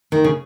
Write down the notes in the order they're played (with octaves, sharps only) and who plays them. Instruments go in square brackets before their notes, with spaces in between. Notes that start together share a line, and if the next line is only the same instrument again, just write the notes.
[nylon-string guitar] D#3
C#3